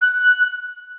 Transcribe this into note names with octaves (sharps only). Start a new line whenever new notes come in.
F#6